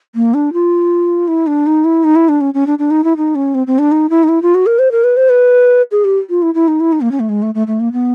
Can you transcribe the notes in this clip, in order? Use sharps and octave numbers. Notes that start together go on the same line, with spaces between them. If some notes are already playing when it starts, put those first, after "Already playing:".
A#3
D4
F4
E4
D4
D#4
E4
D#4
E4
D4
C#4
C#4
D4
D4
D#4
E4
D#4
C#4
C4
C4
D4
D#4
E4
D#4
E4
F4
F#4
A#4
C5
A#4
B4
C5
B4
G#4
G4
F4
E4
E4
D#4
E4
D#4
A#3
C#4
A3
G#3
A3
A3
A3
A#3
B3